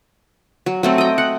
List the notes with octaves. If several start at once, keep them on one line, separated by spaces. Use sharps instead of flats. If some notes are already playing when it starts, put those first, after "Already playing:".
F#3
F#3 A3 C4
D#5 G5
F#5